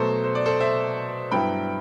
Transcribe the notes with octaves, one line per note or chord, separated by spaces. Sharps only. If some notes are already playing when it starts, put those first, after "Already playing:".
Already playing: B2 F#3 A3 A4 C5
C5
D5
A4 C5
C5 E5
G2 F#3 B3 E4 G5 B5